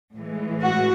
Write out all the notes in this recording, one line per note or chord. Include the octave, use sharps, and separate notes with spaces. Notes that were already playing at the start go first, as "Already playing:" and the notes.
A2 E3 G#3
F#4